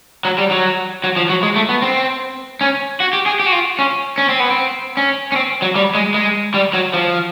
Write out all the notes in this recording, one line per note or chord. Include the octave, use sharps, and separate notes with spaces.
F#3
G3
F#3
F#3
F3
F#3
G#3
A3
B3
C4
C#4
F#4
G4
G#4
G4
F#4
F4
C#4
C#4
C4
B3
C4
C#4
C#4
C4
F#3
G3
G#3
G#3
G3
F#3
F3